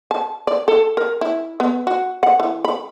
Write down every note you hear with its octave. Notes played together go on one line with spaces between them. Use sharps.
A5
D5
A4
A#4
E4
B3
F#4
F#5
E3
B5